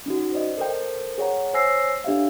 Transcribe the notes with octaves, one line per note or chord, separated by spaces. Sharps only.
C#4 D#4 F#4
C5 D5 D#5
A4 A#4 C5 G5
G#4 C#5 F#5 A#5
C5 C#5 G#5 E6 A#6 C7
D4 G4 A4 C#5 E5 F5